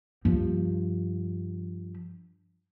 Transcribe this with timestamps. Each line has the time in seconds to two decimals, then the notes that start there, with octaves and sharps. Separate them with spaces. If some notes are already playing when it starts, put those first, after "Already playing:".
0.25 G2 F3